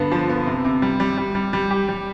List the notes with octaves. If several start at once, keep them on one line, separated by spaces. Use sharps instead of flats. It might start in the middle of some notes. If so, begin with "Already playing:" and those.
Already playing: G2 D3 B3
F3
B3
C3
C3
G3
G3
G3
G3
G3
G4
G3